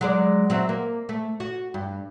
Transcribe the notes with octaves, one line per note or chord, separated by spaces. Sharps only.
F#3 G#3 D5
F#3 C4 E5
A#3
A3
F#4
G2